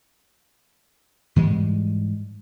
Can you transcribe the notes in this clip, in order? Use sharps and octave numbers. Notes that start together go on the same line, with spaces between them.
G#2 E3 G3 G#3